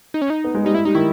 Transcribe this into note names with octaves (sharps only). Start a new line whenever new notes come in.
D#4
C#4
D#4
B3
G#3
G3 D#4
G#3 E4
G3 D#4
D#3 E4